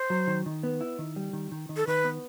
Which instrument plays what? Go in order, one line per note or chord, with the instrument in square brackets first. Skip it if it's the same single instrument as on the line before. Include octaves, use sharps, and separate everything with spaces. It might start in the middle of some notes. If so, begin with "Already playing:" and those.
Already playing: [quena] C5
[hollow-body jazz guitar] F#3
D#3
D#3
B3
E4
D#3
G3
D#3
D#3
D#3
[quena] A4
[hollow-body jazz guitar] D#3 [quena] B4
[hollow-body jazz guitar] B3